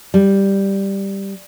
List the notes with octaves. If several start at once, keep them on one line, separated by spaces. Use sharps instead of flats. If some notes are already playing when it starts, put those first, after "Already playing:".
G3